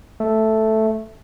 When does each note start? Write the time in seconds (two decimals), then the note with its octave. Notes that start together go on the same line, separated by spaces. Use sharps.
0.20 A3